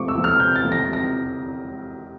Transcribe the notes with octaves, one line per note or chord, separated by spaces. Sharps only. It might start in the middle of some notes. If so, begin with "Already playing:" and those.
Already playing: C3 F3 A3 C4 C#6 D6
E6
F3 A3 C4
F6
C3 G6
A6
F3 A3 C4
A#6
C3
A#6